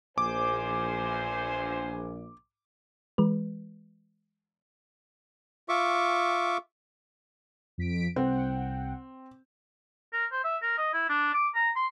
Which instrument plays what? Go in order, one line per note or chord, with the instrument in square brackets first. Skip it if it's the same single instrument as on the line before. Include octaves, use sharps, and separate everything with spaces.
[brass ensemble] A#1 [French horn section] E2 C5 [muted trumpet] G#5 [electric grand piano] D6
[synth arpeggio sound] E3 G#3 B4
[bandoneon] F4 E5 C#6 D6
[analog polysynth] F2 B6 D7
[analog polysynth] C2 F#5 G5 [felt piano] C4
[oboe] A#4
C5
E5
A#4
D#5
E4
D4
D6
A#5
C6